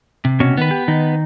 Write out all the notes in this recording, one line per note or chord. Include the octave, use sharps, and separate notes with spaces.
C3
B2 C#4 F#4
D#3 B3 B4
G4
D#3 D#4